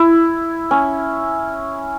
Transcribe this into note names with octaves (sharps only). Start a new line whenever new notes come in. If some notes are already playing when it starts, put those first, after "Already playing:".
Already playing: E4
C#4